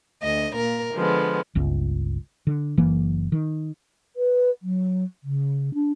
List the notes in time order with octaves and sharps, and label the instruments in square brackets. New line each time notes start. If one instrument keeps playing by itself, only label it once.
[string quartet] D2 D#5
A#2 A#4
D3 F3 G#3 B3
[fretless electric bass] G1 C#2
D3
F#1 E3 A#3
D#3
[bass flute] B4
F#3
C#3
D4